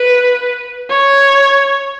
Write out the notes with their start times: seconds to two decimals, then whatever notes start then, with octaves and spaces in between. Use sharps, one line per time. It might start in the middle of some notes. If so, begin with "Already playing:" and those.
Already playing: B4
0.90 C#5